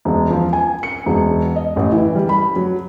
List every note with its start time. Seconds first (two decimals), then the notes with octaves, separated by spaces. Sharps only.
0.05 E1
0.30 F3
0.53 G#5
0.83 C#7
1.06 E1
1.56 D#5
1.76 A1
1.92 E3
2.15 G3
2.29 B5
2.56 F#3